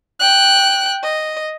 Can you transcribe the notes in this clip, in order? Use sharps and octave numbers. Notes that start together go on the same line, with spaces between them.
G5 F#6
D#5